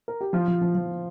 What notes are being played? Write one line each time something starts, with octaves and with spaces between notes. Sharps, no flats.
A#4
G4
F3 F4
F3
F3
F3